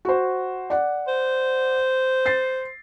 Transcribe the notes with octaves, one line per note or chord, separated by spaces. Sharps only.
F#4 C5
D5 F#5
C5
A6 C7